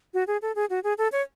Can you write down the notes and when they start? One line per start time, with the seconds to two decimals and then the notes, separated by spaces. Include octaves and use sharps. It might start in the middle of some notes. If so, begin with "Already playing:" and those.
0.14 F#4
0.27 G#4
0.42 A4
0.56 G#4
0.70 F#4
0.84 G#4
0.98 A4
1.12 C#5